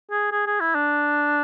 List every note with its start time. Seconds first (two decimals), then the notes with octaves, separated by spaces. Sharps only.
0.11 G#4
0.32 G#4
0.47 G#4
0.60 E4
0.75 D4